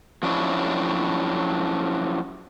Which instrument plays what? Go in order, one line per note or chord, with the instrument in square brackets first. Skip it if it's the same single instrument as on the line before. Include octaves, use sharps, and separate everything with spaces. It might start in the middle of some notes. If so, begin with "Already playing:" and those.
[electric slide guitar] F3 F#3 C#4 D4 E4